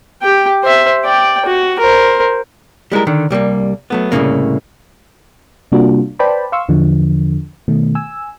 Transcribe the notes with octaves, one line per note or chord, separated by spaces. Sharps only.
G4 G5
C5 E5
D5 G5
F#4
A#4 C5
G3 G#3 E4 A#4
D3 D#3
C2 G3 A3 A#3
F#3 A3 B3
C2 F#2 A2 C#3 A#3
C3 G3 A#3 D4 F4 F#4
B4 C5 D5 G5 A5 B5
F5 C6 C#6 E6
E2 D3 F3
B2 D#3 A3
G#5 E6